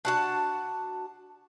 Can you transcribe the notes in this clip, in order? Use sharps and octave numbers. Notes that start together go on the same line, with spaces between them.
D4 F#4 A5